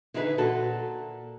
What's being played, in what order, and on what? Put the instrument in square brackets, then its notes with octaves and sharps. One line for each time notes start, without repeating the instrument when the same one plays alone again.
[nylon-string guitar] D3 E3 D#4 E4 G#4 B4
A#2 F#4 A4 A5